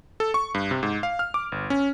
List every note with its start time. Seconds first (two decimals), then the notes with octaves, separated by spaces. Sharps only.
0.20 A4
0.34 C#6
0.54 G2
0.71 C3
0.83 G#2
1.03 F5
1.19 F6
1.34 D6
1.52 G1
1.70 C#4